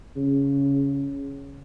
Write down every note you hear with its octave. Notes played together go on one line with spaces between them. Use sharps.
C#3